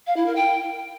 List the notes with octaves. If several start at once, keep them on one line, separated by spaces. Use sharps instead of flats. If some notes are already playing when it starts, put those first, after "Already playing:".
F5
E4
A#4
G5